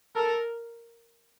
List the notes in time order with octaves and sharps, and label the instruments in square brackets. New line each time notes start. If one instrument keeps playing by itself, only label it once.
[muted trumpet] A4 [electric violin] A#4